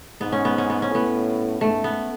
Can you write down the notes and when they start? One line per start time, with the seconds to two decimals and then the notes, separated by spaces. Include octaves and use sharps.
0.21 G#2 B3
0.32 C#4
0.45 B3
0.58 C#4
0.70 B3
0.82 C#4
0.90 A2 B3
1.61 G#2 A3
1.84 B3